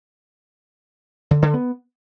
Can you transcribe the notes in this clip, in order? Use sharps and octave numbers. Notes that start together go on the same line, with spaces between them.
D3
D3
B3